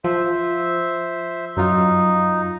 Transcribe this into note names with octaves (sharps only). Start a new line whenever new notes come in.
F3 C5 E5
F#2 D#4 F4